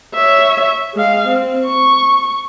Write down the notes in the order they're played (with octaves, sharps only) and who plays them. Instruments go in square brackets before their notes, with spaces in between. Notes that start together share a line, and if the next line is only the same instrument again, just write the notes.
[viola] C#5 E5
G#3 F5
C4
C#6